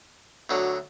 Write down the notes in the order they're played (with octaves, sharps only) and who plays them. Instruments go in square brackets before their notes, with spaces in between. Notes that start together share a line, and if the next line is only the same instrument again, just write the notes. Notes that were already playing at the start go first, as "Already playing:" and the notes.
[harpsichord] D2 D3 F#3